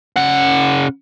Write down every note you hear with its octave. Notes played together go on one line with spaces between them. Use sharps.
C#3 F#5